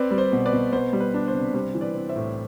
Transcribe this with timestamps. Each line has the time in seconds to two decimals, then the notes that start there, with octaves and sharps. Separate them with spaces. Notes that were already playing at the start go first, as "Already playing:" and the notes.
Already playing: C4 B4 D5
0.11 G3
0.18 C5
0.32 B2
0.45 B4 D5
0.53 B2
0.72 B3 C5
0.93 G3
1.00 B4
1.14 D4
1.28 C5
1.34 C3
1.54 G3 C5
1.74 E3
1.81 B4 D5
1.95 C4
2.09 C5 E5
2.16 A2